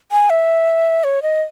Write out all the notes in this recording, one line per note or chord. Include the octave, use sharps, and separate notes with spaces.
G#5
E5
C#5
D#5